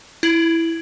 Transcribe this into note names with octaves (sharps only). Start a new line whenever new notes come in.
E4 G#6 F#7